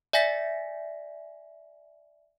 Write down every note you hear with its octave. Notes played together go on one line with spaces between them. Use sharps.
D5 E5 G#5 A#6 B6